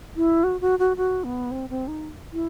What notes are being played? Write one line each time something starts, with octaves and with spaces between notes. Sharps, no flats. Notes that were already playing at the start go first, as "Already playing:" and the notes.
E4
F#4
F#4
F#4
F#4
B3
C4
C4
D#4
E4